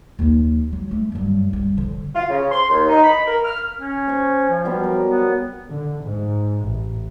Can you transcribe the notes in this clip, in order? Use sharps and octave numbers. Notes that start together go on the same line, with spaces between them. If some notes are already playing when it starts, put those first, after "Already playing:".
D#2 F3
F#3
A3
G2 F#3
G2
D3 F3
F4
C#3
C6
D#2
D#4
B5
A#4
F6
C#4
C5 C6 C#6
F3
F#3 G3 B3
A#4
B3
D3
G#2
A1